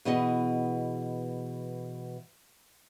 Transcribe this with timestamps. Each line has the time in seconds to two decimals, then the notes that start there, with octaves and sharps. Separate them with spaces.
0.05 B2 E3 G#4 D#5 F#5